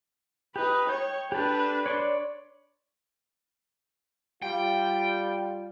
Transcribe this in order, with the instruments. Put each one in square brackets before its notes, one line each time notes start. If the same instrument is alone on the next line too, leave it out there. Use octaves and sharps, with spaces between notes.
[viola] D#4 B4 [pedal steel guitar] G4
[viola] C#5 [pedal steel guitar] G5
[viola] D4 B4 [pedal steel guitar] G4 A4
[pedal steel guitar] C#5 D5 C6
[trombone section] G3 F4 [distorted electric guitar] G5